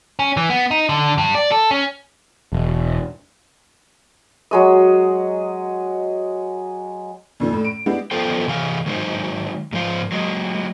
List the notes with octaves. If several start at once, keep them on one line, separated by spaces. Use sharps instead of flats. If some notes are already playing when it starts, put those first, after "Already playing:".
C#4
E3
B3
D#4
D3
G2
D5
A4
C#4
E1
F#3 G#3 D#5
F2 A#2 D#3
A2
D7
G#3 B3 D4 E4 G4
B3 F4 A4 C5 G5
C3 E3 F5
D#3 F#3 G#3 D#4 C5
G#2 F3 C5 F5
F#3 G#3